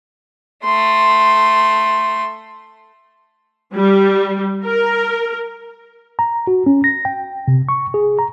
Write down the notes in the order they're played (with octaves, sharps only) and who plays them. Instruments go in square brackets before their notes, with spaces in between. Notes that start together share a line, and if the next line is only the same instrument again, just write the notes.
[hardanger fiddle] A3 C6
[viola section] G3
A#4
[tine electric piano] A#5
F#4
C#4
A#6
G5
C3
C#6
G#4
A#5